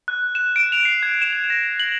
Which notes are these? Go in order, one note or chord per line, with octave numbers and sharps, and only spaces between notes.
F#6
E7
D7
F7
C7
G#6
E7
F7
A#6
F#7